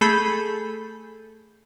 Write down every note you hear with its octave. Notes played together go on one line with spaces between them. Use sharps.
A3 G#4 A4 B5 G6